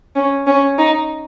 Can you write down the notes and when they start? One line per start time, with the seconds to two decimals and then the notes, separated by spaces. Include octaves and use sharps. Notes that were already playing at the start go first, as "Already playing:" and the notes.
0.16 C#4
0.47 C#4
0.78 D#4